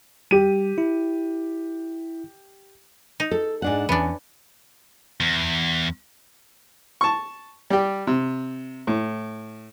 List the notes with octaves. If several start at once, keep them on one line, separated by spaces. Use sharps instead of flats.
G3 G4 D#7
E4
D#4
A4
G#2 D4 F#5
E2 B3 C#4 D4
E2
A5 C#6
G3 G4
C3
A2